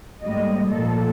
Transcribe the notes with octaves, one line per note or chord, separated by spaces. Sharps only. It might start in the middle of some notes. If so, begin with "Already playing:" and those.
G#2 G3 A3 A#3 D#5
A#2 F3 A#3 A4